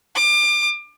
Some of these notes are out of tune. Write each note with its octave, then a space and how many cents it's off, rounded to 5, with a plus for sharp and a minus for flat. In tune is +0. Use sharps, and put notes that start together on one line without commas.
D6 +30